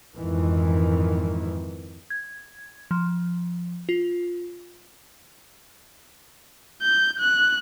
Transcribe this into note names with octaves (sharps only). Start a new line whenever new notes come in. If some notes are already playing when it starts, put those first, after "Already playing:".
F2 G#2 D#3 E3
G#6
F3
F4
G6
F#6